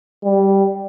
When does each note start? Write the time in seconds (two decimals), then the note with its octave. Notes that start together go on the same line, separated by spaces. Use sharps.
0.24 G3